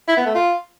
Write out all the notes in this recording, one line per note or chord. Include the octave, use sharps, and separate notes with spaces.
E4
B3
A3
F4